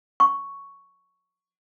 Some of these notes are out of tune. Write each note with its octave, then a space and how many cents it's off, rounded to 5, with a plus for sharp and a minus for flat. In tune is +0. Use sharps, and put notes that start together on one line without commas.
C#6 +5